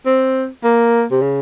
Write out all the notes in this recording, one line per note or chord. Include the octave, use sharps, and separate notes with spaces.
C4
A#3
C3
C#3